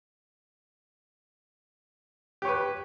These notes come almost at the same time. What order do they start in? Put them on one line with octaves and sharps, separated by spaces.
G4 C#5 B4